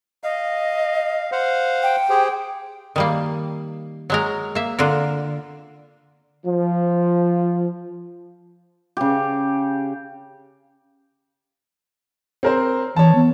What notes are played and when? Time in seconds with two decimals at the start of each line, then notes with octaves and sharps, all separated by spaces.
0.24 D#5 F5
1.32 C5 F5 F#5
1.83 G5
2.10 G4 G#4 C5
2.96 D#3 G3 A#3
4.10 F#3 G#3 A#4
4.55 A#3 E5
4.79 D3 D4 F4 A#4
6.45 F3
8.97 C#3 G4
12.43 C4 A#4 C5
12.96 E3 C#5 A5
13.15 B3